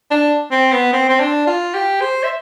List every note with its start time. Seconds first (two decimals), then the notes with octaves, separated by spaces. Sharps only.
0.11 D4
0.51 C4
0.72 B3
0.93 C4
1.09 C4
1.20 D4
1.47 F4
1.74 G4
2.01 C5
2.24 E5